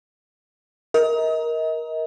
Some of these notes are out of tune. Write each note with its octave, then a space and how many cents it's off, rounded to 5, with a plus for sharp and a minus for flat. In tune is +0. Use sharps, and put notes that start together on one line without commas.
A#4 +15 D#5 +35